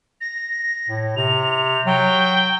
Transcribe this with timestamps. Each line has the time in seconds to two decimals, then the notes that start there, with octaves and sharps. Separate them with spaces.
0.21 A#6
0.89 A2
1.17 C3 F7
1.86 F#3 G5